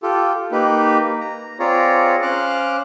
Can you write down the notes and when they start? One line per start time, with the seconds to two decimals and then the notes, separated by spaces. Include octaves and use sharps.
0.03 F4 G4 A4
0.52 A#3 D#4 G4 B4
1.21 A#5
1.59 C4 F4 G#4 C#5 D5 A#5
2.22 C#4 C5 F5 D6 F6 F#6